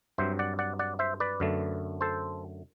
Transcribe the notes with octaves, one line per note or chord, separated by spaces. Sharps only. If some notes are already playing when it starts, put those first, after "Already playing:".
G2 F#3 C4 C5 E5
D5 F#5
D5 F#5
D5 F#5
C5 E5
B4 D5
F#2 D3 A3
A4 C5